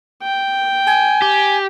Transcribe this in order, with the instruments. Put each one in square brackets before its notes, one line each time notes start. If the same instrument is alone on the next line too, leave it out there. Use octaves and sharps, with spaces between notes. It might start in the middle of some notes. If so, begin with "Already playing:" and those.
[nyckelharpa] G5
[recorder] G#5
[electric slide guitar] G4